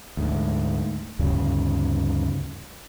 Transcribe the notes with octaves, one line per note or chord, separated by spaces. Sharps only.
D2 G#2
D2 G2 C#3 G3